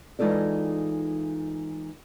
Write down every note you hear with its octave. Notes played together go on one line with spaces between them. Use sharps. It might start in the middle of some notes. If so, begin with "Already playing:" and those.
E3 G#3 D#4 F4 A4 D5